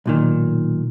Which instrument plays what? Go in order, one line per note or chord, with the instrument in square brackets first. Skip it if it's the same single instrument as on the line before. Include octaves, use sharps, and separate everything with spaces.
[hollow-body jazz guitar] B1 A#2 D#3